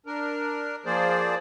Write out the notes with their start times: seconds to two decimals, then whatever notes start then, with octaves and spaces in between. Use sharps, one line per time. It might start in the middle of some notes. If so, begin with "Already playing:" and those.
0.06 D4 A#4
0.86 F3 A#3 G#4 C5 D5